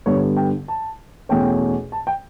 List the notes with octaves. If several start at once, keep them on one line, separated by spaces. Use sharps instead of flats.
G2 D3 G3 B3 C#5
G5
A5
E2 B2 A3 C#4 G5
A5
G5